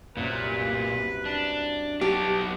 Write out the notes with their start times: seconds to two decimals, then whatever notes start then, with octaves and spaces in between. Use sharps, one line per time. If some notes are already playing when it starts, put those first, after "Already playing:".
0.17 C2 F#2 A#2 B4
1.25 D4
2.01 F#3 B3 G4 D#5 A5